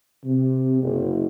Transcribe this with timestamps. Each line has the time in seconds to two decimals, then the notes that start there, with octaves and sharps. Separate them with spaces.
0.25 C3
0.83 F#1